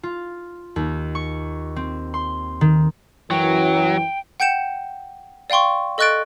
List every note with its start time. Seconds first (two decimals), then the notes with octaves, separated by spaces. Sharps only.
0.03 F4
0.76 D#2
1.15 C#6
1.76 C4
2.14 C6
2.61 D#3
3.31 F#2 E3 F#3 G5
4.40 F#5 G5 G6 C#7 E7
5.50 D5 F5 G5 C6 C#6
5.98 A4 D#5 C#6 F#6 A6 D7